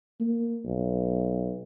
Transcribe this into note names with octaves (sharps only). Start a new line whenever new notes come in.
A#3
B1